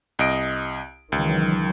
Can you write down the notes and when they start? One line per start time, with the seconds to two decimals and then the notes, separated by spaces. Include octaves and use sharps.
0.19 C2 D#5 D7
1.12 C#2 D#3 E3 F#3